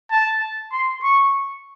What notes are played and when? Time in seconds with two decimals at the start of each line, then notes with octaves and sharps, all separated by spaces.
0.11 A5
0.72 C6
1.03 C#6